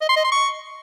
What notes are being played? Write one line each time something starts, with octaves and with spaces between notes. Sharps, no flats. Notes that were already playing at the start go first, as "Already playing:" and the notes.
D#5
C6
D#5
C6
C#6